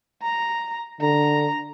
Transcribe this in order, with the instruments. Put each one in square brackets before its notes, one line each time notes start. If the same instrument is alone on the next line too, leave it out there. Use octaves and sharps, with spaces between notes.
[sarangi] A#5
[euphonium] D3 [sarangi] A#5